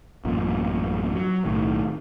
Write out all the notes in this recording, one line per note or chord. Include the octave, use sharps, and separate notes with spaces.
A1 F#2 A#2
F#3
B1 A2 D#3